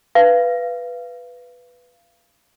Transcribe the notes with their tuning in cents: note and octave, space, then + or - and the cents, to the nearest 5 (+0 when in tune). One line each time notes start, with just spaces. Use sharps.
B4 +0 F5 -25